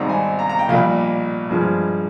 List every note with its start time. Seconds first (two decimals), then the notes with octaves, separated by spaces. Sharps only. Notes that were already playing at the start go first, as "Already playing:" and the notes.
Already playing: G#1 G#2 G3 C4 D#4 A#5
0.09 G#5
0.39 A#5
0.49 A#5
0.59 G5
0.68 A#1 A#2 G3 F5
1.50 G2 F3 G#3